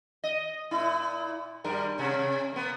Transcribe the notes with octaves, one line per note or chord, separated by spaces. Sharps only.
D#5
A#2 E4
G2 G3 A#4
C3 C#4
A#3 B3